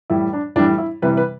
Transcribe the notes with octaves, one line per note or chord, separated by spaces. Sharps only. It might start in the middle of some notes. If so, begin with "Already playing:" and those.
A2 E3 G3 E4
D4
A2 E3 G3 D4
E4
C3 E3 G3 B4
B4